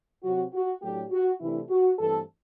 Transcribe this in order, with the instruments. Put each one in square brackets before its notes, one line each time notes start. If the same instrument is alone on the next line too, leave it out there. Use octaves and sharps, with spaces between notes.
[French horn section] C3 F#3 C4 F#4
F#4
A2 F#3 A3 D4 G4
F#4
C3 E3 A3 D4 E4
F#4
G2 E3 A3 C4 A4